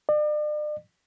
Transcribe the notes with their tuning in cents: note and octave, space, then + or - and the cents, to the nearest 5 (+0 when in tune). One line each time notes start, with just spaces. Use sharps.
D5 +40